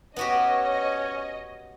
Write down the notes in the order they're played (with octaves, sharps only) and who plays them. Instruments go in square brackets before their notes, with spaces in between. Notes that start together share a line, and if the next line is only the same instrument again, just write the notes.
[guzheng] B3 F#4 G4 [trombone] C#4 [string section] C#5 D#5